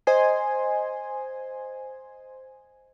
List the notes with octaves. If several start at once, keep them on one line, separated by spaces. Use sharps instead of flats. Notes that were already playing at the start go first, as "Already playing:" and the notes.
C5 D#5 G#5 C6